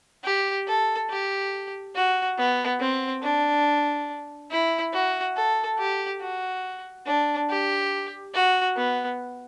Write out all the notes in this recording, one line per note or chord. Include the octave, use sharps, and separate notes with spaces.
G4
A4
G4
F#4
B3
C4
D4
E4
F#4
A4
G4
F#4
D4
G4
F#4
B3